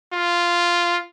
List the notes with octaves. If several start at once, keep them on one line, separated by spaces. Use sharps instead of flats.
F4